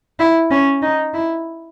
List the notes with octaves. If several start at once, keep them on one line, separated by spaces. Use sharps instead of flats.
E4
C#4
D#4
E4